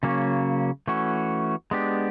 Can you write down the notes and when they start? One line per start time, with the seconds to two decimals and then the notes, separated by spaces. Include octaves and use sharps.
0.03 C#3 F#3 A#3 C#4
0.87 E3 A3 C#4 F#4
1.71 G#3 B3 D4 G4